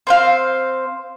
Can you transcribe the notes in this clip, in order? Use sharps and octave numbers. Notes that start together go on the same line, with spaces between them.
C4 C5 F5